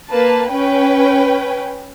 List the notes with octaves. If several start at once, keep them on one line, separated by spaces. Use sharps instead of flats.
A#3 B4 A5
C#4 B4 G5